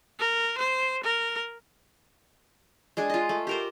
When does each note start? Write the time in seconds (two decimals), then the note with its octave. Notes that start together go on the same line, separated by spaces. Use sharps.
0.19 A#4
0.58 C5
1.04 A#4
2.97 G#3 D4 G#4
3.10 F4 D#5
3.29 A3
3.47 G4 A#4 C5